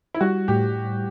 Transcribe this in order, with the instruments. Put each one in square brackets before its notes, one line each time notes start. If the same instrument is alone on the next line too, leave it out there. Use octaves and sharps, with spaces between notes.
[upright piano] E4
[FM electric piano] G3 [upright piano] F#4
[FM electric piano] A2 [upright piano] G4